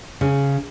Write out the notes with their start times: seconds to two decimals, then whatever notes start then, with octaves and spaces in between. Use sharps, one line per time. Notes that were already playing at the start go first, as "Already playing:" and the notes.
0.21 C#3